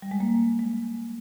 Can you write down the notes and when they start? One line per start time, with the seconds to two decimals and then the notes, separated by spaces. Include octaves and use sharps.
0.02 G3
0.11 G#3
0.20 A#3
0.59 G#3